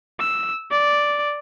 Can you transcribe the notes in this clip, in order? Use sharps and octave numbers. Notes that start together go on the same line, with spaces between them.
E6
D5